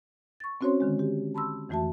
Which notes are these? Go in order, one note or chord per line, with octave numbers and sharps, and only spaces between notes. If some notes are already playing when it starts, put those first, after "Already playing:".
C#6 A6
C4 C#4 F#4 C5 C#5 C6
D3 D#3 G#3
G4
A5 B5 C6 E6
F2 E3 A3 F#4 E5 A5